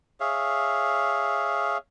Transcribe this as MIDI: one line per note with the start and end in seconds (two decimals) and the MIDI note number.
0.20 1.78 68
0.20 1.78 73
0.20 1.78 76
0.20 1.78 77